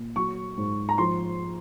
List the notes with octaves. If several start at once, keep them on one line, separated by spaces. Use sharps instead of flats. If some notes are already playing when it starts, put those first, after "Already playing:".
Already playing: A#2
F#3 C#6
G#2
A#5
F3 C6